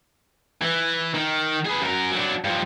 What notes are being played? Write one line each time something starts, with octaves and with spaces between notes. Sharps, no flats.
E3
D#3
G#4 B4
F#2 A#4
F#3 D4
G2 F3